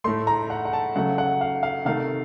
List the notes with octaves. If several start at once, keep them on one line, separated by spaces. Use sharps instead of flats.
A2 A3 C6
A#5
F#5
F#5
A5
C#3 F#3 A3 F#5
F#5
F5
F5
C3 D#3 A3 F5